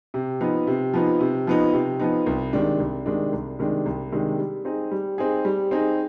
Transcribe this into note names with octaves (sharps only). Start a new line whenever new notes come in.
C3
F3 B3 D#4
C3
F3 B3 D#4
C3
F3 B3 D#4
C3
F3 B3 D#4
C2
C3 D#3 G#3 D4
C2
C3 D#3 G#3 D4
C2
C3 D#3 G#3 D4
C2
C3 D#3 G#3 D4
G3
C4 D#4 G#4
G3
C4 D#4 G#4
G3
C4 D#4 G#4